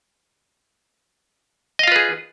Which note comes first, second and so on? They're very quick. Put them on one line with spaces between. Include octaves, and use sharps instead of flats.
D#5 F5 F4 B4 G#4